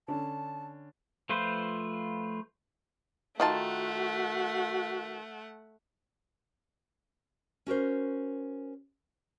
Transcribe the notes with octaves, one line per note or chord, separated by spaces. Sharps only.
D3 C#4 D4 A5
F3 A3 F4 B4 C5
D#3 A3 F4 F#4 F#5 A5
C#4 F#4 A#4 C5